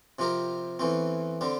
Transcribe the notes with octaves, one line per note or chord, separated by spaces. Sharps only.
C3 F3 C4 G4 A#4
E2 E3 A3 C4
D3 G3 C4